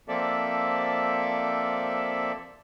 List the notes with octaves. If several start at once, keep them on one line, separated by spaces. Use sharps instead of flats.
F3 A#3 C4 A4 D5 E5